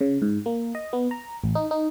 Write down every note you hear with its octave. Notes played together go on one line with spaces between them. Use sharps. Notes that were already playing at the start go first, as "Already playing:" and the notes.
C#3
G#2
A#3
D#5
B3
A#5
A1
D#4
D#4